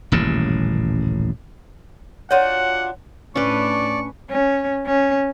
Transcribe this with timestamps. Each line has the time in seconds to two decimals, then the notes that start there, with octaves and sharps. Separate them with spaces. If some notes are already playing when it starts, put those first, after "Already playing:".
0.12 D#1 A1 F#2 C#3
2.31 D4 F4 F#4 C#5 F#5
3.36 A2 C#4 D4 B4 D5 C#6
4.30 C#4
4.86 C#4